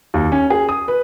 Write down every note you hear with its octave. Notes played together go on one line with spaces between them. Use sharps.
D#2
C#4
G#4
D#6
B4